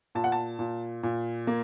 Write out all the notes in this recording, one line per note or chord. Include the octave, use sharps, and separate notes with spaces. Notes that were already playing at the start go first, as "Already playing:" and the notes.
A#2 A5
F#5
A5
A#2
A#2
A#3